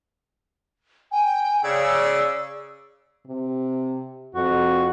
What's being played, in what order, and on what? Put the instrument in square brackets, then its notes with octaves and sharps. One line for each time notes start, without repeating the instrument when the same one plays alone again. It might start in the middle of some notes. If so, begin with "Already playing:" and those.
[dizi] G5 [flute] G#5
[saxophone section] C#3 [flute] D5 [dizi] E6
[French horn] C3
[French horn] F2 [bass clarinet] F#4